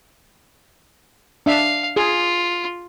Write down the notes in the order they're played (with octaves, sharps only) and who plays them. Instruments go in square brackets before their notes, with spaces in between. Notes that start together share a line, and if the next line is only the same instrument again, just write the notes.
[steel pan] D4 E5 [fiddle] F5
[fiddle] F4 [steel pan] G#4